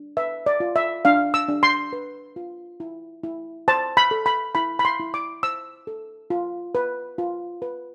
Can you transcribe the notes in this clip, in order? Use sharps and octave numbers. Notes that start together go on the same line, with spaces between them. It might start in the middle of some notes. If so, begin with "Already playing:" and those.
Already playing: D4
B4 E5
D5
F4
E5
D4 F5
E6
D4
C6
B4
F4
E4
E4
C5 A5
B5
A4
B5
E4 B5
B5
C6
E4
D6
C5 E6
A4
F4
B4
F4
B4